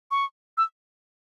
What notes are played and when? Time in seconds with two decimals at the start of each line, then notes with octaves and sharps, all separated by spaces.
0.11 C#6
0.57 E6